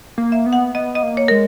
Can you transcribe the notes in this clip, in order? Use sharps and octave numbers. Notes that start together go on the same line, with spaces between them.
A#3
E5
B3
F#5
B3 D#5
D#5
A#3
C#5
G#3 A#4